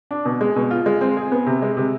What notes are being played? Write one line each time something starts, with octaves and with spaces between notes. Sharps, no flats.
D4
B2
G#3
B2
F4
G#3
C4
G#4
B3
C3
G#3
C3